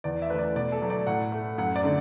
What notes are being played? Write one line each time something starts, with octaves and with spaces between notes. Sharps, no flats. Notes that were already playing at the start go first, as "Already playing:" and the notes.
E2 D5
E5
E3 A3 B4 D5
B2 D5
A4
F#3 A3
D5
A2 F#5
A3
F#2 F#5
D5
D3 A3